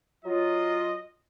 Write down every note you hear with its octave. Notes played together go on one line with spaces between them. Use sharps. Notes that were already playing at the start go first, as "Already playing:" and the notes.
F#3 F4 D#5